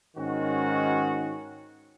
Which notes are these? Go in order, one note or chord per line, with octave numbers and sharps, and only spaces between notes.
G#2 D#3 C#4 F#4